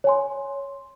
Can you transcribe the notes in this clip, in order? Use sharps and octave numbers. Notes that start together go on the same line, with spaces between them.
C#5 G#5 C6